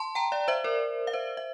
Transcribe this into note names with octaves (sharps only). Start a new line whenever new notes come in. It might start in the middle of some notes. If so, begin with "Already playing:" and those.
Already playing: A5 C6
G5 A#5
D5 F5
C5 E5
A#4 D5
F5
C5 E5
E5